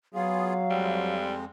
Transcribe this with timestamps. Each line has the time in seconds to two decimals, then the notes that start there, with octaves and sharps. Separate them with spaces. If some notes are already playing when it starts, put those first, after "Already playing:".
0.14 F#3 B3 F4 G#4 F5
0.70 F2 G3 G#3 C4